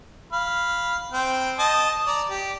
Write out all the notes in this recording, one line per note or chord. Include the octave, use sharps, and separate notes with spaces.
F5 B5
C4 G5
D#5 A5
D5 A#5
G4